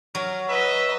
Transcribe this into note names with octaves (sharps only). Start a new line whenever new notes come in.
F#3 A#4
B4 D#5 E5